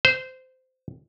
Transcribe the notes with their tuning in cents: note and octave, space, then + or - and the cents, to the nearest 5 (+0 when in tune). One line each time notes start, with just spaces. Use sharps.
C5 -20